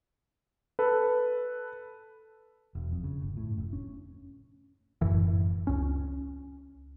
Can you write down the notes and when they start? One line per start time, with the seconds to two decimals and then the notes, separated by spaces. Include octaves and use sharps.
0.79 A4 B4
2.75 E1
2.92 F2
3.04 C#3
3.22 G1
3.37 A2
3.57 F1
3.73 C#4
5.01 F#1 F#2 A2 E3
5.67 C#2 C#4